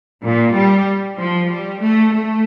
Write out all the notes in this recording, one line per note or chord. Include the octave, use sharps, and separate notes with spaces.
A#2
G3
F3
G3
A3
A3